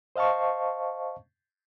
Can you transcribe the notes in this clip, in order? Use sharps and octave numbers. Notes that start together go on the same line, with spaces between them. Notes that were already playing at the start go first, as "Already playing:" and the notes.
C5 D#5 F5 A5 C#6